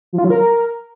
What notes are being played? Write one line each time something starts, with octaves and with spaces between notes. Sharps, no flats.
F3
F4
F#3
A#4